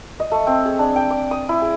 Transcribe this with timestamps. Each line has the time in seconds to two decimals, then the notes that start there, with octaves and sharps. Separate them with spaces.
0.20 D#5
0.32 A3
0.47 C4
0.65 G#4
0.79 D4
0.96 G5
1.10 D6
1.31 D#6
1.49 E4
1.62 G#4